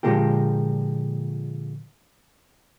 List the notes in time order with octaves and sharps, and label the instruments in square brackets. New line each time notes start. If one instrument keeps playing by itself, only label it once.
[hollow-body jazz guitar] A#2 D3 F3 G#3 A#3 G4